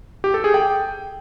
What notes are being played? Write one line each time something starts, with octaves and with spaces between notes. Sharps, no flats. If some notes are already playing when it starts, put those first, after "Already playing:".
G4
A4
G#4
G5